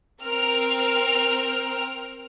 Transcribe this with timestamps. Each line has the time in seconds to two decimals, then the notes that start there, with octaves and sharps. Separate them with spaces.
0.21 C4 A#4 F6